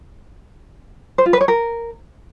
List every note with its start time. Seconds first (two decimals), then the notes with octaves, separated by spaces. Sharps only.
1.18 C5
1.26 F4
1.33 B4
1.41 C#5
1.48 A#4